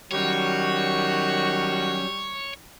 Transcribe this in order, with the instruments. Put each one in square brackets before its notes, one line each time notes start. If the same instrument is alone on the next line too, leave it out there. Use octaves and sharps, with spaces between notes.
[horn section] D#3 F#4 [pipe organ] F#3 C#4 [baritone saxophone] G3 [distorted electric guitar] C#5